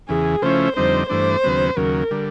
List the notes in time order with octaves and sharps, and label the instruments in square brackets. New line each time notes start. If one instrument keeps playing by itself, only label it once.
[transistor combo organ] E2 C#3 E3 [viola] G#4
[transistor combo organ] C#3 F3 A3 C#4 E4 [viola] C5
[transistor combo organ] F2 D3 G3 C4 D#4 [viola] C5
[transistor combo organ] G2 E3 A3 D4 [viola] C5
[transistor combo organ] D#2 C#3 F#3 B3
[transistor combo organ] D#2 C#3 F#3 [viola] A#4
[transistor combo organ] D3 G3